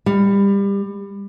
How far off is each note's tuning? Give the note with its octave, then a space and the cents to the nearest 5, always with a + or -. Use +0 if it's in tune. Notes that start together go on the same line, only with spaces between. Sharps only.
G3 +25